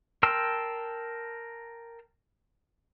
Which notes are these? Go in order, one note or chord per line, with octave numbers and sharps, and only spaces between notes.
A#4 G5 A5 C6 E6